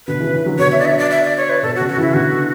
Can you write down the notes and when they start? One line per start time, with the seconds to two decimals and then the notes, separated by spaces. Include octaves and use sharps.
0.07 B2 D3 B4
0.20 C#3 E3
0.33 C#3 E3
0.46 D3 F#3
0.59 B2 D3 C#5
0.72 E5
0.79 D5
0.85 E5
0.98 D5
1.10 E5
1.24 D5
1.37 C#5
1.50 B4
1.62 B2 A4
1.76 F#4
1.80 C#3
1.88 F#4
1.97 C#3 E3 E4
2.14 B2 D3 F#4